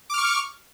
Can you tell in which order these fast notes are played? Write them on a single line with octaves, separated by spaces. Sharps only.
D6 F6 C#6